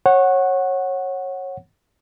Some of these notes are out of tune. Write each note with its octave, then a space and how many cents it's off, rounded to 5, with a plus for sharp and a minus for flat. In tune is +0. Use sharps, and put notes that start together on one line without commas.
C#5 -20 F#5 +0